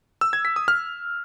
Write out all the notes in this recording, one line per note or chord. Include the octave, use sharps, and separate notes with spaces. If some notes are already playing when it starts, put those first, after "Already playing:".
E6
G#6
B6
D#6
F6